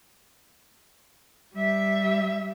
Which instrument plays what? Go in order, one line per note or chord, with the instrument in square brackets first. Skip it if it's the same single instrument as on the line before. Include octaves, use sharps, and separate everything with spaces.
[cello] G3 E5